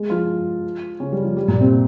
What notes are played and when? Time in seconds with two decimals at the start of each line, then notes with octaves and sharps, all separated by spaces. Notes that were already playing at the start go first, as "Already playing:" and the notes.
Already playing: G#3 G#4
0.10 F3 F4
1.00 C#3 C#4
1.12 G3
1.24 F3
1.36 G3
1.48 A#2 A#3
1.60 C3 C4